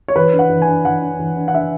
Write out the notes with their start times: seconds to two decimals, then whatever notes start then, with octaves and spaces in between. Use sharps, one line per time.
0.08 C#5
0.16 E3 B4
0.33 D4
0.39 F#5
0.50 E3
0.62 G#5
0.67 D4
0.85 E3 F#5
1.02 D4
1.19 E3
1.37 D4
1.48 F#5
1.54 D4 E5